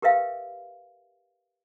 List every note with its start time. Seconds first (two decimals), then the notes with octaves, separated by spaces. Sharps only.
0.02 G4 A#4 B4 E5 F5 G5